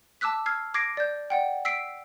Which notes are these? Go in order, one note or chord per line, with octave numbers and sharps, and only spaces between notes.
A5 D6 E6 F#6 B6
E6 F6 G#6 C7
D6 G#6 A#6 C7 D7
D5 G6
D5 F#5 G5
E6 B6 C7 D7